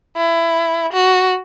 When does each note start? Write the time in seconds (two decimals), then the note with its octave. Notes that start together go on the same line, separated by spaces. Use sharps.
0.17 E4
0.93 F#4